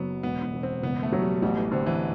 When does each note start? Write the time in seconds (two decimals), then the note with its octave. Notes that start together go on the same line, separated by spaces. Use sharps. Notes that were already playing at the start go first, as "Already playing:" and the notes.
Already playing: F#1 F#3 B3
0.23 E1 B3
0.43 B3
0.53 E1
0.63 C4
0.83 F#1 B3
1.03 A3
1.12 F#3
1.22 G3
1.42 A1 G3
1.58 E3
1.72 D3 C4
1.86 E3